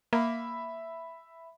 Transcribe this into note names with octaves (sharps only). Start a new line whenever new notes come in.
A#3 E5 B5